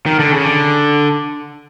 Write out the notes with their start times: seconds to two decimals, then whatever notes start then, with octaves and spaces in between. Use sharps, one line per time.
0.06 D#3
0.19 D3
0.32 C#3
0.45 D3